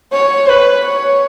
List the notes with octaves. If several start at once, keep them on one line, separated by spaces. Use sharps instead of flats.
C#5
B4
C#5